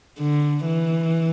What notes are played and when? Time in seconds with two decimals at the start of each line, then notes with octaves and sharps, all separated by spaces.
0.19 D3
0.66 E3